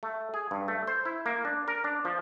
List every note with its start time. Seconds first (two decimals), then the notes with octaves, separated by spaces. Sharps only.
0.03 A3
0.34 G#4
0.51 G2
0.68 A3
0.87 C5
1.05 E4
1.26 A#3
1.45 D4
1.68 A#4
1.84 D4
2.05 F3